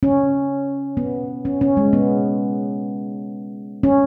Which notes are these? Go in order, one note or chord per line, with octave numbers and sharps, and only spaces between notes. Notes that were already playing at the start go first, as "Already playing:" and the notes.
C#4
B3
C#4
C#4
G#3
B3
C#4